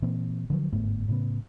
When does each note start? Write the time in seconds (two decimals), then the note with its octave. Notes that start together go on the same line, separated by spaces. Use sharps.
0.02 A#2 E3 A#3 C4
0.50 D3 F3 F#3
0.72 G1 G#2 A3 B3
1.08 A2 C#3 B3